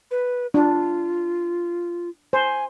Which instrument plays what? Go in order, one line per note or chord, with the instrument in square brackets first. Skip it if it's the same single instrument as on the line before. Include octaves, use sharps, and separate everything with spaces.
[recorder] B4
[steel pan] D4 [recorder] F4
[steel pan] C5 [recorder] G#5